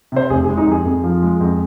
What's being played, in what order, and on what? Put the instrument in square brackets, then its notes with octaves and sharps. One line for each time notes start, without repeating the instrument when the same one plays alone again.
[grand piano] C3 C5
F1 G#4
G#4
G#3
D#4
F2 G#4
F2
F3
G#3
F2